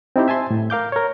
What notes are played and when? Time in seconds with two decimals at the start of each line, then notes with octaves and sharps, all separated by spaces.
0.16 C4 D#4 E4 G4
0.28 E5 G#5 A5 C6
0.51 A2
0.70 A#4 F5 D6 G6
0.92 A#4 C#5